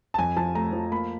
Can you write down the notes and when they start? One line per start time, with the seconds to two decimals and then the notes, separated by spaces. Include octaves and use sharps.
0.14 A5
0.18 F2 G#5
0.36 F3 A5
0.55 A3 A#5
0.73 F3
0.92 A#3 B5